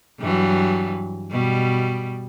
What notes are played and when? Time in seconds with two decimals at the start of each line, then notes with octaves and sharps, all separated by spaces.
0.20 G2 E3 F#3
1.31 B2 G3